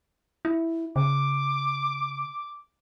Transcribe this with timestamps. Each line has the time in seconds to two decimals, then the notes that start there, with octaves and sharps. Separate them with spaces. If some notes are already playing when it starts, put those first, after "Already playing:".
0.45 E4
0.96 C#3 D6